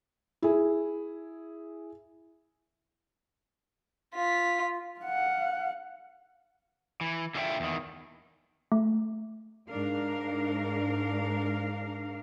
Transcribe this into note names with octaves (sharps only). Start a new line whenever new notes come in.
E4 G#4
F4 B6
F5 F#5
E3
D3 F4 G#4 C#5 E5 G5
E2 D#3
A3
G#2 D4 A#4 F5